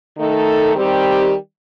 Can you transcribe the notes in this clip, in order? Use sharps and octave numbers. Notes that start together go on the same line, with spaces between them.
D#3 A3 D#4 A4
D#3 G3 C4 G4